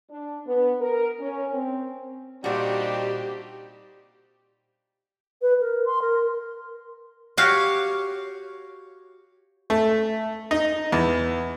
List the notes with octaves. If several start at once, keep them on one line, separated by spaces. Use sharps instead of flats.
D4
B3
A#4
C#4
C4
A#2 G3 C4 D4 D#4 F#4 G4
B4
A#4
C6
A#4
F#4 G4 C#5 F5
A3
D#4
E2